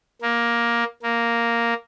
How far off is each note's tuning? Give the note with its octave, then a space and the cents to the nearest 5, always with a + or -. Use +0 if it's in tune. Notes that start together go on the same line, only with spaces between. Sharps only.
A#3 +10
A#3 +0